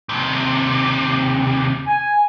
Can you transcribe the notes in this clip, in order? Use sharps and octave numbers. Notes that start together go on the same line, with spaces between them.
D#2 C3
G#5